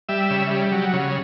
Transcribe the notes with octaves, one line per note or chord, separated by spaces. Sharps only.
G3 E5
C#3
G3
F#3
C#3